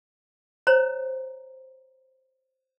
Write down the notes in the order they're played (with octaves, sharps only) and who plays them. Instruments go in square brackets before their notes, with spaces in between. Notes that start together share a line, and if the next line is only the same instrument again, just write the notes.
[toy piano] C5 C#5 A#5